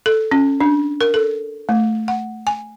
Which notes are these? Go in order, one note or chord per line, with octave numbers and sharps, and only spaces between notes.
A4
C#4
D4
A#4
A4
A3
F#5
G#5